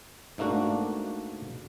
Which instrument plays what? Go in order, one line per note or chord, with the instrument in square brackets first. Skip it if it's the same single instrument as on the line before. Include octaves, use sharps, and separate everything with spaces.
[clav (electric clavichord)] G#2 A3 A#3 D4 F#4